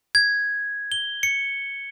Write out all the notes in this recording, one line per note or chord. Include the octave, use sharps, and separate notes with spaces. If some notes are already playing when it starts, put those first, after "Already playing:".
G#6
G7
C#7